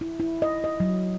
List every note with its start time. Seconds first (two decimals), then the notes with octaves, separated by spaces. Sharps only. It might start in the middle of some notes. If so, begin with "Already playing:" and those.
0.01 E4
0.20 E4
0.42 D#5
0.64 D#5
0.80 F#3